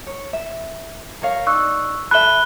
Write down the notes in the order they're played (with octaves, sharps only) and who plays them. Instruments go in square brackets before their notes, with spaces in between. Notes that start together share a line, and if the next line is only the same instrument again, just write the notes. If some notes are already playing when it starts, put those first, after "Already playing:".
[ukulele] C#5
E5
A#4 C#5 F5
[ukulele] D#4 D5 [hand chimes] C#6 E6 F#6
[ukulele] A4 E5 [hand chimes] B5 [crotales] F#6 G7